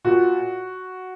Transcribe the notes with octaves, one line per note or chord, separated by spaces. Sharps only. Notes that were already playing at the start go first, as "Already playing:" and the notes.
A#2 F#4